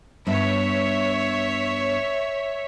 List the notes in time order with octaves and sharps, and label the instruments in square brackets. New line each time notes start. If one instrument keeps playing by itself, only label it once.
[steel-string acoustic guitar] G2 B3 [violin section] C#5 E5